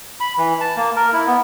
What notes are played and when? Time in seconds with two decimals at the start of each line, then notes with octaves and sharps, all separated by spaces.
0.20 B5
0.37 E3
0.61 A5
0.77 A#3
0.96 A#4
1.13 E4
1.27 B3